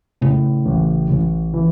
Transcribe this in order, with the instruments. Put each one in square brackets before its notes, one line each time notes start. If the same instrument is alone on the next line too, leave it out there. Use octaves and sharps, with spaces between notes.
[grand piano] A2 [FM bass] C#3
[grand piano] A1
A1
E3